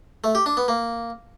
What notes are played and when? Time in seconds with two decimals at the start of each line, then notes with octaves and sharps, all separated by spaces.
0.24 A3
0.35 G4
0.46 D4
0.57 B3
0.68 A#3